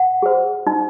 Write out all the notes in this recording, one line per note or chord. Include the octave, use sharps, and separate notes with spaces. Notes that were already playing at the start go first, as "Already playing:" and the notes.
Already playing: F#5
G#4 C5
D#4